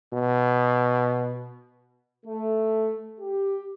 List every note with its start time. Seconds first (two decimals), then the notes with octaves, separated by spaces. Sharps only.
0.13 B2
2.26 A3
3.20 G4